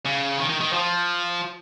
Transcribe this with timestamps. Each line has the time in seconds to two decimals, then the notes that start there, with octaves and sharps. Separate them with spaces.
0.05 C#3
0.38 D#3
0.50 D#3
0.61 D#3
0.73 F3